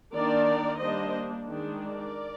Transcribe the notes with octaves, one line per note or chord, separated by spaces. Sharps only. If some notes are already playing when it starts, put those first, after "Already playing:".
D#3 A#3 D4 A#4 D5
G3 A#3 D4 C5 D#5
D#3 G#3 D4
A#4 D5